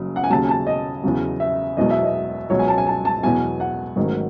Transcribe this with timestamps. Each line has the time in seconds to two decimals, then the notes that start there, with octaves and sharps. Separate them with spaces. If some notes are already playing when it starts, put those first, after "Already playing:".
Already playing: F#1 C#3 F#3
0.16 F#5
0.24 G#5
0.30 D#2 C#3 F#3 A5
0.44 G#5
0.49 A5
0.67 D#5
1.03 E2 C#3 F#3
1.40 E5
1.77 E1 E2 B2 F#3 D#5
1.91 E5
2.04 D#5
2.50 C#2 B2 F#3 C#5
2.59 G#5
2.68 A5
2.78 G#5
2.87 A5
3.05 A5
3.23 E2 B2 F#3 G#5
3.60 F#5
3.96 A1 G#2 D#3 F#3